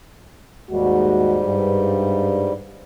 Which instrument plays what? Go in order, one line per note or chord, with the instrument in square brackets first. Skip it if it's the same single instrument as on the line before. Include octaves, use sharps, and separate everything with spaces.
[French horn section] D#2 G#3 F#4 [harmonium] G#2 G3
[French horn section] G2